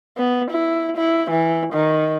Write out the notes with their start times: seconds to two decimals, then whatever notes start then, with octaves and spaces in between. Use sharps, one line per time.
0.17 B3
0.51 E4
0.97 E4
1.31 E3
1.73 D#3